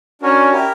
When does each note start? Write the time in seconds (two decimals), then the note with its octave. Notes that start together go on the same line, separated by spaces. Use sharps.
0.21 C#4 D4 F#4 A#4
0.52 E4 G4 A#4